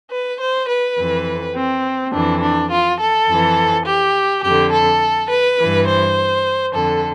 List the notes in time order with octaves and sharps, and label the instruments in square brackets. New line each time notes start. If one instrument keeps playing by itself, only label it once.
[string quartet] B4
C5
B4
F2 E3
C4
F2 E3 D4
D4
F4
A4
F2 E3
G4
F2 D3 G4
A4
B4
G2 E3
C5
F2 D3 A4